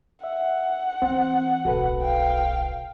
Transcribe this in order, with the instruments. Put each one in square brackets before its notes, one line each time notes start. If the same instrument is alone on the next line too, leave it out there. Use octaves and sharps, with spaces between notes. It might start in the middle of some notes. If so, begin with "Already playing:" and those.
[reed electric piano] E5 [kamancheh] F#5
[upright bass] E3 [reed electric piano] C4
[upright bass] D1 B1 [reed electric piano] F#4 A4 B4
[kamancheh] F5 G5